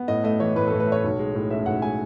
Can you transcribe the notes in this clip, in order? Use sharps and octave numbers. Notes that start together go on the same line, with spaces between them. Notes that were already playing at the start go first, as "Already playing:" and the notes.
Already playing: B3
A2 D#5
A3 D#5
E3 C#5
A2 B4
A2 A4
B4
A3
C#5
B1
G#3
A2
C#4 E5
B1 F#5
G#3 G#5